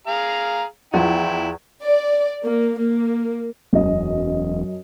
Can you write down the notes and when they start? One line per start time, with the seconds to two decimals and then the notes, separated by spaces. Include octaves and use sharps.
0.07 G#4 F5 A#5
0.94 E2 F3 E4 G5
1.83 D5
2.43 A#3
2.78 A#3
3.73 E1 F#2 D#5